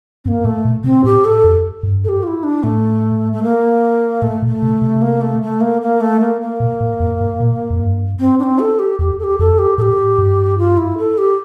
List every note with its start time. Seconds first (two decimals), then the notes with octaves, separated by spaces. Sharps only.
0.25 G2 C4
0.28 A#3
0.44 A2 A3
0.65 A#2
0.84 C3 C4
1.04 A2 G4
1.25 A4
1.44 F2
1.83 G2
2.04 A4
2.09 G4
2.23 F4
2.27 E4
2.43 D4
2.63 A2 A3
3.33 A3
3.43 A#3
4.22 A2 A3
4.42 A#2
4.47 A3
4.62 C3
4.82 C3
5.02 A#3
5.21 A3
5.42 A3
5.61 A#3
5.82 A#3
6.01 A3
6.20 A#3
6.41 A#3
6.60 A#2
6.81 A2
7.00 F2
7.21 G2
7.40 A#2
7.70 F2
7.80 G2
8.20 C4
8.39 D4
8.43 C4
8.59 A4
8.79 G4
8.99 E2 G4
9.19 A4
9.24 G4
9.39 F2 A4
9.59 G4
9.78 A2 A4
9.82 G4
10.18 G2
10.58 F4
10.77 E4
10.98 A4
11.18 G4